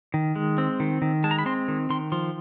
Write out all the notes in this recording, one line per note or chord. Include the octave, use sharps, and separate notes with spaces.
D#3
G#3
C4
D#3
D#3
G#3 A5
A#5
B5
C4 C6
D#3
D#3 C6
F3 C6